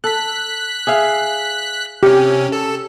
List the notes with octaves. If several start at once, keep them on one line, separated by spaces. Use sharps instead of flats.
A4 F#6 B6
G#4 E5 F5
C3 C#4 G4
A4